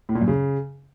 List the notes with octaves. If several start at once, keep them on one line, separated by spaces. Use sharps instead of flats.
A2
A#2
F#2
C#3